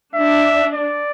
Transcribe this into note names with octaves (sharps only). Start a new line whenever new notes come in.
D4 E5
D5